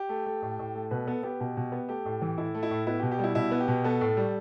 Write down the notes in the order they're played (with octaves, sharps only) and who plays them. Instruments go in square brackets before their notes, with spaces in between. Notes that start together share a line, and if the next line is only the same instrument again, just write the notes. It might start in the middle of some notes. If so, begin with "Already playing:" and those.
Already playing: [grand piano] G4
A3
A3
A2
A2
A3
B2 B4
B3 A4
B3 G4
B2
B2
B3
A3 G4
A2
E3
A2 E4
A3
E4
A2
B3 E4
G4
B2
G4
G3 E4
B2 E4
B3
G4
B2
B3 A4
A2
G3